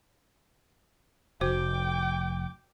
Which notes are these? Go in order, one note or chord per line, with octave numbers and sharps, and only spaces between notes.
F1 F#4 C5 G5 D6